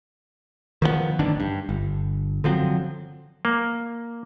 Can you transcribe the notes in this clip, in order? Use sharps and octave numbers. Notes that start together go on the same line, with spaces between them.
D#3 F3 G3 B3
A1 D3 D#3 D4
G2
G1
D3 F3 F#3 C4
A#3